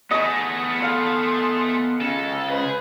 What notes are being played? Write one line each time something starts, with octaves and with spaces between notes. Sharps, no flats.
A3 B3 G#4 D#5 C#6
A4 F5 C6
C#3 G#3 A4
G#4 B4 C5